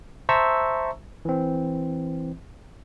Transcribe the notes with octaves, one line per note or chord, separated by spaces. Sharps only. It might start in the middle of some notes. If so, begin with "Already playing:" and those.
C5 E5 A5 A#5 C#6 E6
E3 C4